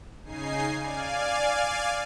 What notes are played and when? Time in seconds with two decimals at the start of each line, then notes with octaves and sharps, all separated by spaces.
0.25 C#3 D#4 G#5 C7
0.81 D5 F5 G#5